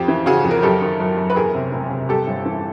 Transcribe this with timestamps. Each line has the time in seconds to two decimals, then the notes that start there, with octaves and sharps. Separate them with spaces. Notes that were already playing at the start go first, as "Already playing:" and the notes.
Already playing: F2 G4
0.08 E3
0.26 C#3 F#4 G#4
0.44 F2
0.51 A#4
0.62 F#2 G4 A4
0.81 D#3
1.00 F#2
1.17 F#2
1.30 B4
1.36 E2 G#4 A#4
1.54 C3
1.72 E1
1.91 C3
2.09 G2 G4 A4
2.27 G1
2.45 E3